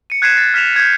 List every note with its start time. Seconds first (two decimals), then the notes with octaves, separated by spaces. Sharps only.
0.10 C#7 D#7
0.22 F#6 G#6 B6 C7 D#7 E7
0.36 A6 C7
0.54 F6 B6 E7 F7
0.76 G6 G#6